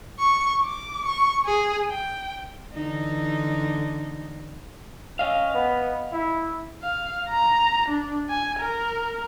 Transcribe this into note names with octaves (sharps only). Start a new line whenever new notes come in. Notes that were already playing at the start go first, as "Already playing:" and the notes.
C#6
D6
C#6
G#4
G5
D3 E3 D#4
C#4 D#5 F5
B3
E4
F5
A#5
D4
G#5
A#4